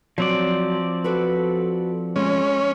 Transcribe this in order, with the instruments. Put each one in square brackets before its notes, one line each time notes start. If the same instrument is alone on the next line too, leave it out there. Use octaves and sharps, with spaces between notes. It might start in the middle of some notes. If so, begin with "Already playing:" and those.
[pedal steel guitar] F3 C4 D5 [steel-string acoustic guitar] F#3
[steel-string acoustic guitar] F#4 A4 B4
[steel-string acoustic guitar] G#3 [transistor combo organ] C#4